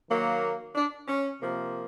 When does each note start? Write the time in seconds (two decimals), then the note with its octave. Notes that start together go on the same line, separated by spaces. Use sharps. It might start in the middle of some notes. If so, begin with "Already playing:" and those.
0.09 D#3 F#3 A#3
0.75 D4
1.08 C#4
1.42 C3 F3 A#3